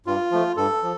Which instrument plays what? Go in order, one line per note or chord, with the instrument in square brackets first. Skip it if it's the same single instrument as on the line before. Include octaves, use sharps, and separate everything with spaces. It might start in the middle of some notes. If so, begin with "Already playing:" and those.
[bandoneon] G2 F4
F3 A3
G2 A4
F3